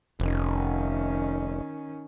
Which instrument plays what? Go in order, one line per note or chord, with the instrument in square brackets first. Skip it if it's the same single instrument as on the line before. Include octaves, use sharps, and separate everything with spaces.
[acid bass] F1 [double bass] D#3 C#4